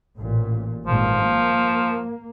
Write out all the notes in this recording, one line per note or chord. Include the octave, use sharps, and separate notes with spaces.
A1 A#2
G#1 G2 A#2 F3
A#3